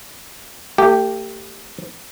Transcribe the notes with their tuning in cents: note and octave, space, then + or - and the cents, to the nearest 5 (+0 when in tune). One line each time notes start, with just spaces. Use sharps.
A3 +40 G4 +0